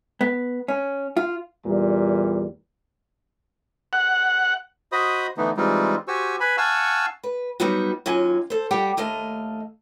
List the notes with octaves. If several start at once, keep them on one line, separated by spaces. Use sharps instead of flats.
B3
C#4
F4
E2 A#2 G3
F#5
F#4 C5 D#5 B5 D#6
D3 E3 A3 B3 D#4
E3 G3 G#3 C4 D#4 F4
F#4 G4 C5 G#5 C#6 E6
B4 G#5 B5
F5 F#5 G#5 A5 C#6 E6
B4
F#3 G3 B3 D#4 F#4
D#2 F#3 C#4 F4 G#5
A4 C5
G3 G4 F#5 G5
D#2 A3 D#5 F5